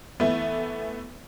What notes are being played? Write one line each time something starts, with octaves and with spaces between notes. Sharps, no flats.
E3 A3 B3